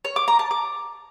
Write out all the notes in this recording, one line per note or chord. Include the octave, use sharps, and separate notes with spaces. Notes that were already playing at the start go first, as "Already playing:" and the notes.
C#5
D6
A#5
A5
D6